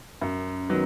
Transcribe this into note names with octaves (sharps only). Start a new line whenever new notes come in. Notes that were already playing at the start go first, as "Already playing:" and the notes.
F#2
D#3 F#3 B3